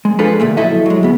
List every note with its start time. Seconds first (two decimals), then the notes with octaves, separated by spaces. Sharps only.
0.05 G#3
0.19 F3 D4 F4 G#4 A4 B4
0.40 D2 G2 A#2 A3
0.57 F3 F#3 E4 A4 D#5 E5
0.86 F#3 G#3
1.03 D2 B3